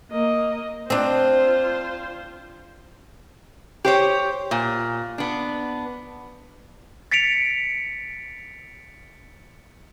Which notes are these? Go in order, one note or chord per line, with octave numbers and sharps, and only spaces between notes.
A#3 D#5
C4 D4 F4 C5
G4 C5 C#5
A#2
B3 D4
A6 B6 C#7 D7 F7